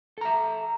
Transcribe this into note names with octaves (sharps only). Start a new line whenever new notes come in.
A4 E5 A#5